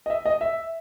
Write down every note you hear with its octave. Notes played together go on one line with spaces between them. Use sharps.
D#5
E5
D#5
E5